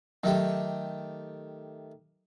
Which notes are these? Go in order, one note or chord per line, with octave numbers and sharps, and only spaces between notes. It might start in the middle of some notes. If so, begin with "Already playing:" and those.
D#3 F#3 A3 G4